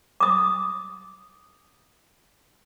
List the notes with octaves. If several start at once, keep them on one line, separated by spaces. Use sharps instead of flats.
D6 D#6